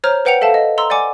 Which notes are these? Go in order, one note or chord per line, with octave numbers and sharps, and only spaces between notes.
C5 C#5 A#5 F6
B4 C5 F#5 G5 C#7 F7
A4 E5 F5 A5
D#5
A#5 C6 E6
D5 F#5 G#5 D6